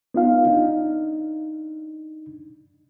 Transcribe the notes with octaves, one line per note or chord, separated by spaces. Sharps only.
B3 D#4 F4 F5
D4 D#4